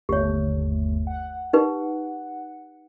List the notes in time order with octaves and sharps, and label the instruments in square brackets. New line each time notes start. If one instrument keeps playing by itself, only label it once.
[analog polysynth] G1 D#2 A3 [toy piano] G4 C#5
[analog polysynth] F#5
[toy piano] D#4 G4 B4